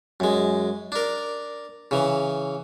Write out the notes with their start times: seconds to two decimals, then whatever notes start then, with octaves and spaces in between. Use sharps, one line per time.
0.20 F#2 G#3
0.92 D4 A#4
1.91 C#3 E3